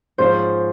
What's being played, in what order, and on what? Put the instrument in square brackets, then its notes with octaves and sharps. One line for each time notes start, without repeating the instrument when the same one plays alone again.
[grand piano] G#2 F3 G#3 C#4 F4 [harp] C5